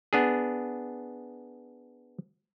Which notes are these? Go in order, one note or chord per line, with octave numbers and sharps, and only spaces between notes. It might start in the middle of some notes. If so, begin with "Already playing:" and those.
B3 D4 G#4